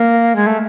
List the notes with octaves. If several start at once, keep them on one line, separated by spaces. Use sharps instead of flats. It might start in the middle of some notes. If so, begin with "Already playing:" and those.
Already playing: A#3
G#3
A3